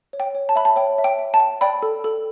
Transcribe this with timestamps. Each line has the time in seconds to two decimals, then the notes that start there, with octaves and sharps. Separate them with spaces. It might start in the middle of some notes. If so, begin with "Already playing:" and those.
0.13 C#5
0.20 G5
0.35 C#5
0.49 A5
0.56 E5 B5
0.65 A5
0.76 C#5 G5
0.98 E5
1.04 G5
1.19 E5
1.34 A5
1.40 G5
1.61 D5 G5 B5
1.82 A4
2.04 A4